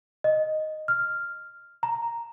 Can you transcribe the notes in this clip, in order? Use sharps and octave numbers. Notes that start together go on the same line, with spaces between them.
D#5
F6
A#5